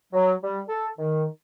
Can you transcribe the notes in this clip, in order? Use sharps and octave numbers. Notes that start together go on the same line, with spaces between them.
F#3
G3
A4
D#3